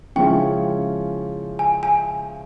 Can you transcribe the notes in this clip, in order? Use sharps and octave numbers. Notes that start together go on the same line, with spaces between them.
C#3 F3 G#3 C#4 E4 G5
G#5
G#5